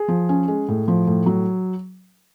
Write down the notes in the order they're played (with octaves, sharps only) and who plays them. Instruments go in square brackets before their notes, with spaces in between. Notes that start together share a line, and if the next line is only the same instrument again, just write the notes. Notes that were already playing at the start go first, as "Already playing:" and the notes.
Already playing: [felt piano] G#4
F3
C#4
G#3
A2
F3
A2
F#3